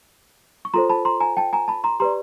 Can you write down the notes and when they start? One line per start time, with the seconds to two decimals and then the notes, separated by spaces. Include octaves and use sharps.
0.65 C#6
0.74 F4 A4 C5 A#5 C6
0.89 A5 B5
1.05 A#5 C6
1.20 G#5 A#5
1.37 G5 A5
1.53 G#5 A#5
1.68 A5 B5
1.84 A#5 C6
2.00 G4 B4 D5 A#5 C6